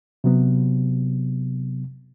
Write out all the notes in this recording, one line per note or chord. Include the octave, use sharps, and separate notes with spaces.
C3 F#3 B3